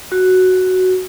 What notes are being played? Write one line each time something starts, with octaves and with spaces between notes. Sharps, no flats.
F#4